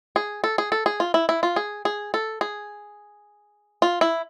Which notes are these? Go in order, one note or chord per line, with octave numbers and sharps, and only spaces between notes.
G#4
A4
G#4
A4
G#4
F4
E4
E4
F4
G#4
G#4
A4
G#4
F4
E4